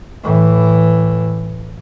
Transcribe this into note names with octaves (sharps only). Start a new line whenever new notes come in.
A2 E3